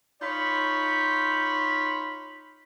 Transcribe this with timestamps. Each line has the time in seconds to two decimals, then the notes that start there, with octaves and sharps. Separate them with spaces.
0.22 D#4 F4 C#5 B5